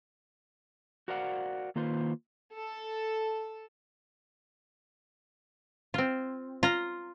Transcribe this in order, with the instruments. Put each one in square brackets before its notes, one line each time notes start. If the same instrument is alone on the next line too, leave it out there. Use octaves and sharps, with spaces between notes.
[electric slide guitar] F#4 A#4 C5 D5 F5 F#5
D#3 A#3 F4 B4 C5
[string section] A4
[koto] C4 F4
F4 A#5